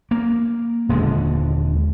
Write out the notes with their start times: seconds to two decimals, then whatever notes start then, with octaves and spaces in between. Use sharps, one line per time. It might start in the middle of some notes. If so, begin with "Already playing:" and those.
0.11 A#3
0.89 D#1 D#2 D3 G#3